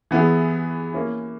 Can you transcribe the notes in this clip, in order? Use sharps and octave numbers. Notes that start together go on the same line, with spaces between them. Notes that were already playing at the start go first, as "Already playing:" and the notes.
E3 B3 E4 G#4
A#3 C#4 E4